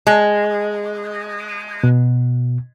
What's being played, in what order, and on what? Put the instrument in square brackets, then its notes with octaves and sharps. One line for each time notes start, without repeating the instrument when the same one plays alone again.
[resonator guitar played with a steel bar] G#3
[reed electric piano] B2